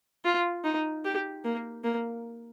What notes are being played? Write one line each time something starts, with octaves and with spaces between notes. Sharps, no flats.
F4
D#4
G4
A#3
A#3